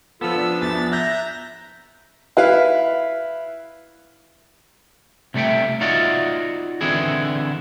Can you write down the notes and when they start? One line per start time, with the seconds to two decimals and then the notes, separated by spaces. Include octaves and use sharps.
0.21 F3 B3 F4 A4 E6
0.36 D4
0.61 E2 A6
0.92 E5 A#5 F#6 G6 A#6
2.37 E4 B4 F5
5.34 C3 G3 A3 E5 G5
5.81 D#4 F4 F#4 C#5 D5 E5
6.81 D3 E3 C4 E4 G#4